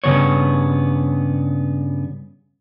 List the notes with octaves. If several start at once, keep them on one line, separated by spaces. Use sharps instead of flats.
G2 C#3 B3 C#5